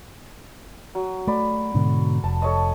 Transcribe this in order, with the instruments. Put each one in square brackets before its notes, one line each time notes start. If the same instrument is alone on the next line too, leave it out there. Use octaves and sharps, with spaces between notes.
[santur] F#3
[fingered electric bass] A3 [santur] D5 B5
[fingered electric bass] G#2 B2 D3
[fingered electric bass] F1 [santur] A5
[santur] A4 C#5 D#5